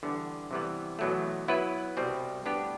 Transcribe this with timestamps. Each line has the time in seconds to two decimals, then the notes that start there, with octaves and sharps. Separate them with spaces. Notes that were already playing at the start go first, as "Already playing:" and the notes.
0.03 E2 D3 G3 B3 D4
0.51 C3 E3 G3 B3
0.99 E2 B2 F#3 A3
1.48 F#3 B3 E4 B4
1.97 C2 B2 G3 C4
2.45 A2 G3 B3 D4 G4